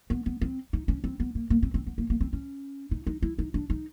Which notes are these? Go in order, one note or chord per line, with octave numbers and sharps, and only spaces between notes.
B3
B3
C4
D#4
C#4
C4
B3
A#3
A#3
C4
C4
B3
A#3
A#3
C4
C#4
D#4
D#4
E4
D#4
D4
D#4